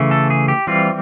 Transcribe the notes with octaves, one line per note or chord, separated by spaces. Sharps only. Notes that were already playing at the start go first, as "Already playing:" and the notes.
Already playing: C#3 E3 A3
A4
G#4
G4
E3 G3 C4 F4